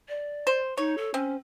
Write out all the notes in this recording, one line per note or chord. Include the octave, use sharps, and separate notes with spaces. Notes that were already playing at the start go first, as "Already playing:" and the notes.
D5
C5
D#4 C#5
A4
C4 C#4